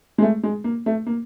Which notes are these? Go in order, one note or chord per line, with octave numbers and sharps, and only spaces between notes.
G#3
A3
G#3
A#3
A3
A#3